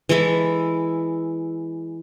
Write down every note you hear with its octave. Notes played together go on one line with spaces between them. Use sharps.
E3 G#3 E4 A4